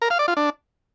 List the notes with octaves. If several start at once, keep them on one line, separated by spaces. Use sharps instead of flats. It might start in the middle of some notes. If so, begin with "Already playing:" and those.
A#4
F5
D5
F4
D4